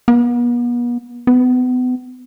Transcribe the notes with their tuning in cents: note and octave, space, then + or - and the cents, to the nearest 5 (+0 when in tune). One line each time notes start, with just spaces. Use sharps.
B3 -40
B3 +30